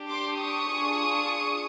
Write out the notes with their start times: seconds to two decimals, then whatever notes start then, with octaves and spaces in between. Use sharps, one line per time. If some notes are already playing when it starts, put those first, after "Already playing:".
Already playing: D4 G4
0.09 C6 D6
0.38 C#6 D#6
0.67 D4 F4 G#4